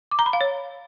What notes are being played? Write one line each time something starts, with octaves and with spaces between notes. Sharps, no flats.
D6
A#5
B5
F5
C#5